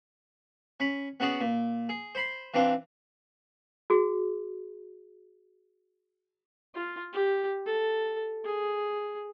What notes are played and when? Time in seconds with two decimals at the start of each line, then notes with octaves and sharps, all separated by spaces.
0.80 C#4 B5
1.20 B3 C#4 F#4 G#4 D5
1.41 A#2
1.89 G#4
2.15 C5 B5 C6
2.54 E3 C4 D4 F4
3.90 F#4 G#4
6.75 F4
7.13 G4
7.66 A4
8.45 G#4